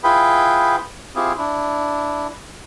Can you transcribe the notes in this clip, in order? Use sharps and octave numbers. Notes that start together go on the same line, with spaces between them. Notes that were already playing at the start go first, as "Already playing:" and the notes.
E4 F4 G#4 B4 G5 B5
C4 E4 F4 G4 G#4
D4 E4